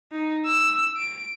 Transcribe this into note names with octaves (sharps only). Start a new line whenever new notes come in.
D#4
E6
D7